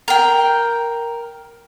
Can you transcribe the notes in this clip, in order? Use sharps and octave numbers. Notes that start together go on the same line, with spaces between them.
A#4 G5